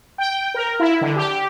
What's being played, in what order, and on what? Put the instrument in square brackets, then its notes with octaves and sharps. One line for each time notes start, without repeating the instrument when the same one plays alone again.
[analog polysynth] G5
A#4
E4
D3
G4